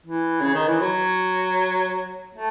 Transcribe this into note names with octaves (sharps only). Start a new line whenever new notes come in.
E3
C#3
D#3
E3
F#3
A3